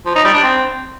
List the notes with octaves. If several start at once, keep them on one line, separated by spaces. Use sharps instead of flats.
F3
D#4
G3
D4
C4